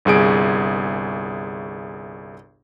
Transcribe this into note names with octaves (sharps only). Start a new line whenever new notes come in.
G1 C2 G#4 D7